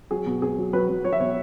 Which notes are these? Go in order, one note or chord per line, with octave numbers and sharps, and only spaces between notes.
F#3 G#4
B2
B2 G#4
F#3
F#3 B4
F#3
F#3 C#5
E5
B2 C#5